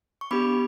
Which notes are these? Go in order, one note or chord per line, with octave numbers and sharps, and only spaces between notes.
C#6
B3 D4 G4 B5 D6